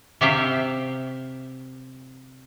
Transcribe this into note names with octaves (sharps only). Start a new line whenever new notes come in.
C3 G4 E5 F5 G5